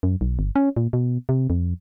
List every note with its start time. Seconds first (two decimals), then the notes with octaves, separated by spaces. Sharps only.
0.03 F#2
0.21 B1
0.39 G1
0.56 C#4
0.77 A#2
0.93 B2
1.29 C3
1.50 F2